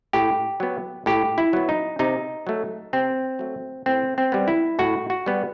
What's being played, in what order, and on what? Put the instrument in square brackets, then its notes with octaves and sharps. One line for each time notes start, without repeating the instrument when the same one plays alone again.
[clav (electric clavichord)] A2 G4
F#3 B3
A2 G4
E4
F#3 B3
D#4
C3 D#4
F#3 A3
C3 C4
F#3 A3
A2 C4
C4
G3 B3
E4
A2 F#4
F#4
G3 B3